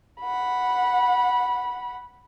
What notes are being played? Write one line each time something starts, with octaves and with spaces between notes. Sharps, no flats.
F#5 B5